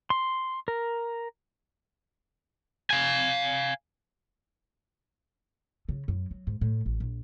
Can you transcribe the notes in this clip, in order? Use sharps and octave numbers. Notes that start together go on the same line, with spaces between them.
C6
A#4
F5 G#5
C#3
F#2
F#3
G#2
A2
A1
A#1